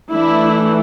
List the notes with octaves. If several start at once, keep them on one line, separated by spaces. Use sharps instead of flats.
E3 A3 D4 E4